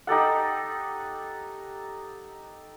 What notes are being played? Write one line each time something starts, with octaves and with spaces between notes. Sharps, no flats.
D#4 G4 A4 F#5